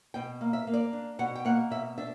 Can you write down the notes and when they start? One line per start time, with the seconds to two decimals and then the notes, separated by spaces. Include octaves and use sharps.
0.14 B2 G5
0.41 A#3
0.53 E5
0.67 A#3
0.74 D5
0.93 D4
1.19 B2 F#5
1.35 G5
1.45 A#3 F#5
1.70 B2 E5
1.98 D4 E5